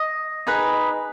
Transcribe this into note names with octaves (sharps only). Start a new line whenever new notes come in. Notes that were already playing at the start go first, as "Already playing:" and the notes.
Already playing: D#5
D#4 G#4 B4